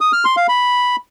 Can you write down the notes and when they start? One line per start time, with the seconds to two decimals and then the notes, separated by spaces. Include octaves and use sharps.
0.01 D#6
0.13 F6
0.25 C6
0.37 F5
0.49 B5